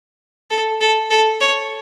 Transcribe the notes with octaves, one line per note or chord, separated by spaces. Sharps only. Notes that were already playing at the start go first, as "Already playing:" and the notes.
A4
A4
A4
C#5